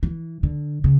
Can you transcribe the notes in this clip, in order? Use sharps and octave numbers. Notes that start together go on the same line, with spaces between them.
E3
D3
C#3